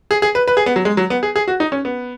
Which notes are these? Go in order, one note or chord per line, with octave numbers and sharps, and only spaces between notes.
G#4
G#4
B4
B4
G#4
B3
F#3
G#3
F#3
B3
G#4
G#4
F#4
D#4
C#4
B3